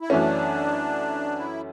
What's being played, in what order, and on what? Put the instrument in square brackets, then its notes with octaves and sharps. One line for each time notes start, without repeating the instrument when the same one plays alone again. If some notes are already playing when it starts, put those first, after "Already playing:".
[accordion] E4
[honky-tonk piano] F#2 E3 A3 C#4 [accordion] D4
[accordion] E4